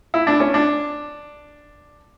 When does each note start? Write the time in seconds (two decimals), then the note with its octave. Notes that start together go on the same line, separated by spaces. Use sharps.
0.14 E4
0.27 D4
0.40 C#4
0.54 D4